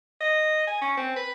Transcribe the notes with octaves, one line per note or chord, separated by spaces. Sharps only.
D#5
G#5
C#4
C4
B4